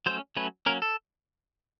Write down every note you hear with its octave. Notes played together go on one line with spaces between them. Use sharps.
F#3 A3 C#4 C5
F#3 A3 C#4 B4
F#3 A#3 C#4 A#4
A4